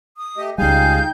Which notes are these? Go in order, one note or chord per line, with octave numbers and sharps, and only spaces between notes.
D#6
A3 G4 D#5
C#2 G3 D#4 G#4 F5 G5 G#5 G6